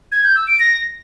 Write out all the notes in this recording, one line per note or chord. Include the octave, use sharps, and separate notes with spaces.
G#6
G6
E6
D7
A#6